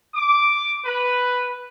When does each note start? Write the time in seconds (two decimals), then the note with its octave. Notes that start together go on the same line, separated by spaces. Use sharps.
0.15 D6
0.85 B4